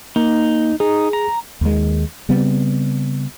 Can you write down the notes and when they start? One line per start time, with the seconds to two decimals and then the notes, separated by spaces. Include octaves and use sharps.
0.16 A#3 D#4
0.80 D#4 G#4
1.13 A#5
1.61 D#2 D#3 G#3
2.29 C#3 G3 B3 C4